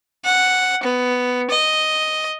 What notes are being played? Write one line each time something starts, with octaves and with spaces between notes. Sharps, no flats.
F#5
B3
D#5